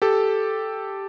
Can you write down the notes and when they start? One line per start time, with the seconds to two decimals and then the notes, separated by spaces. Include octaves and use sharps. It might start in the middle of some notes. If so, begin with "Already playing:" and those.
0.02 G4 A4